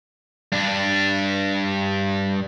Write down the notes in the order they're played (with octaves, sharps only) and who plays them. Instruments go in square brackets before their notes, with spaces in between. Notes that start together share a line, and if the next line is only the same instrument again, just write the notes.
[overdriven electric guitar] G2 D4